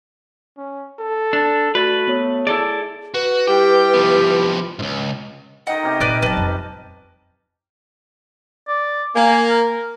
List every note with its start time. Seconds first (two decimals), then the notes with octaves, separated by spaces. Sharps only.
0.57 C#4
0.99 A4
1.33 D4
1.75 A3 F#4 B4 D5 A6
2.08 B3 C#5 D#6
2.47 E4 G#4 A4 D5
3.14 F#4 B4
3.48 G3 E4 G4 G5
3.94 F3 B3
4.79 C#2 G#2
5.67 D#3 D#4 D#5 F#5 G5
5.83 C3 C#4 G4
6.00 A#2 B4 D5 F6
6.22 F#3 B4 A5
6.37 F2
8.68 D5
9.16 A#3 G#5
9.50 A#4